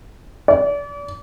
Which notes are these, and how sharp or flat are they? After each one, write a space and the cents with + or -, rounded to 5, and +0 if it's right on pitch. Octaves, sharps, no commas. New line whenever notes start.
D5 -35